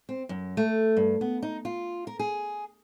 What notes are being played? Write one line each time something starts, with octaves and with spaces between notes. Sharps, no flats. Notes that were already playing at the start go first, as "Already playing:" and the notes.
C4
F#2
A3
G2
B3
D#4
F4
A#4
G#4